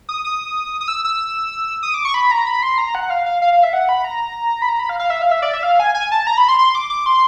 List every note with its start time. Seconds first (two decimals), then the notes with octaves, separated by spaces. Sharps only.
0.09 D#6
0.25 D#6
0.81 D#6
0.88 E6
1.05 E6
1.83 D#6
1.94 D6
2.05 C#6
2.14 B5
2.31 A#5
2.47 B5
2.63 C6
2.78 A#5
2.95 F#5
3.10 F5
3.26 F5
3.42 F5
3.53 F5
3.63 E5
3.73 F#5
3.89 B5
4.04 A#5
4.62 B5
4.69 A#5
4.79 B5
4.89 F5
4.99 F5
5.10 E5
5.22 F5
5.31 E5
5.42 D5
5.54 E5
5.63 F5
5.80 G#5
5.95 G#5
6.12 A5
6.27 A#5
6.37 B5
6.48 C6
6.59 C6
6.75 D6
6.90 D6
7.06 C6